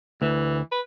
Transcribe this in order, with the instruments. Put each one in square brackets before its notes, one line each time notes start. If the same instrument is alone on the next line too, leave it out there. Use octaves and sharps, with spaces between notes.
[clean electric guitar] D2 [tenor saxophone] E3
[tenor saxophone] B4